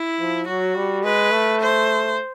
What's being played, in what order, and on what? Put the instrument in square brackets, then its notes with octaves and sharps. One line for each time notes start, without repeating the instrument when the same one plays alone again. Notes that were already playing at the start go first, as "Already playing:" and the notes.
Already playing: [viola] E4
[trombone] F3
[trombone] F#3 [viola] F#4
[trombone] G3
[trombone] G#3 [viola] B4
[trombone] A3
[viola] C5